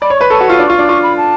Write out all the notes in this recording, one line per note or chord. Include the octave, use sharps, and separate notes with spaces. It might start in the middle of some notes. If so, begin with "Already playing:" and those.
D5 B5
C#5
C#6
B4
A4 C#6
F#4
F4 C#6
D4
F4 C#6
D4
F4 C#6
B5
A5